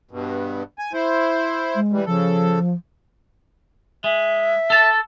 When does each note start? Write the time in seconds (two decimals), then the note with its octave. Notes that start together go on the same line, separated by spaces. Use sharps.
0.11 G2 B2
0.79 G#5
0.93 E4 C5
1.75 G#3
1.92 E3 G3
2.06 C#3 F3 A4
4.04 G#3 E5
4.70 A4 A5